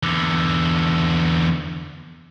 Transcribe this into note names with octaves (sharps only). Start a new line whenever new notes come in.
E2 D3